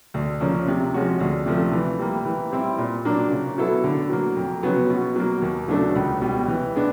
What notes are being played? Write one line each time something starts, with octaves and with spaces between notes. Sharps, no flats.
D2
C#3 F3 A#3 C#4
C3
F3 G#3 C#4 F#4
D2
C3 F3 A3
E3
G3 A#3
E3
G3 C4 E4
A#2
F#3 A#3 D4
C#3
F#3 B3 E4 A4
D3
F#3 A#3
F2
C#3 F#3 B3
B2
F#3 A#3
D#2
C#3 F#3 A3 D4
C#2
B2 G3
E3
G#3 B3 D4